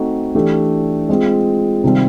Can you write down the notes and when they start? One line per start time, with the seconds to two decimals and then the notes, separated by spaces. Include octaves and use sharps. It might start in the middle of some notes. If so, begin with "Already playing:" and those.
Already playing: A3 C4 D#4 F#4
0.35 E3 A3 D4 G4
1.09 G#3 C4 F4
1.84 C3 D#3 G3 C4